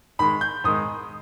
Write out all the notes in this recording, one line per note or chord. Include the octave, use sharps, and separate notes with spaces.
G#2 D#3 G#3 B5
G6
G#2 D#3 G#3 D#6